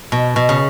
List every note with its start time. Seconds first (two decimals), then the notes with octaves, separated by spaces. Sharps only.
0.12 B2
0.36 B2
0.49 C#3